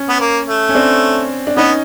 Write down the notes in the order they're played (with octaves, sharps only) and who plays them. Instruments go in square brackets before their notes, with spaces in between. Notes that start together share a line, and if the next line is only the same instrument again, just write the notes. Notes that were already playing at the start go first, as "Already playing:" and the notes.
Already playing: [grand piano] C#4
[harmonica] B3
A#3
A3
[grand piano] C#4
C4 D4
D4
[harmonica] B3 [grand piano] C#4 D#4